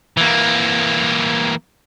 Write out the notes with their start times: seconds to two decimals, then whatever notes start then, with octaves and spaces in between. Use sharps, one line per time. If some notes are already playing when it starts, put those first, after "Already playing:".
0.17 E3 A#3